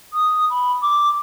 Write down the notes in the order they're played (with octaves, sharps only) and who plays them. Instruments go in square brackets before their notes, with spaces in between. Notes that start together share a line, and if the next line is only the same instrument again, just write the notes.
[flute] D#6
B5
D6